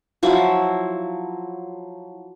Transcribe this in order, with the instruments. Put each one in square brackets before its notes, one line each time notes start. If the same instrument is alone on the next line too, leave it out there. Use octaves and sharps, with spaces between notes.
[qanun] F3 F#3 E4